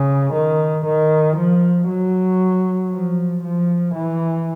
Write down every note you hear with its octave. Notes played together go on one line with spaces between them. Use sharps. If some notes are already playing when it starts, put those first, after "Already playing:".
Already playing: C#3
D#3
D#3
F3
F#3
F3
F3
E3